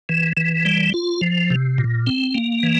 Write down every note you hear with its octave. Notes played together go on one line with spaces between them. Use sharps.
E3
E3
G3
F4
F3
C3
A#2
C4
A#3
E3